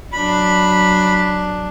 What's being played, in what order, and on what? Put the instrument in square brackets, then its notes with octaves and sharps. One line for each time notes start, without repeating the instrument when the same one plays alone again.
[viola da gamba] F#3 D4 [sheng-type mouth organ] B5